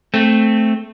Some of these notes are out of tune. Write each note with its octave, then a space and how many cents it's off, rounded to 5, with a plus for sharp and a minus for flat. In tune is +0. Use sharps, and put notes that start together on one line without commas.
A3 +0 C4 +0